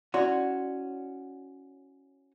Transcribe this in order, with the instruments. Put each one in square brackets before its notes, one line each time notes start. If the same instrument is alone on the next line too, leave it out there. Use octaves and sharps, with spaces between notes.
[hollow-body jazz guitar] C#4 F#4 [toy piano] E4 D5 C6